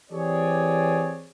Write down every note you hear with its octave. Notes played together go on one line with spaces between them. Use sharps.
E3 C4 G4 G#4 C#5 D5